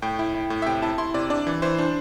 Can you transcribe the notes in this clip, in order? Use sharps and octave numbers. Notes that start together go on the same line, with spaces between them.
A2 G5
E4
E4
A2
E5
C3 G5
E4 A5
E4 C6
C3 D5
D4 D5
E3
E3 C5
D4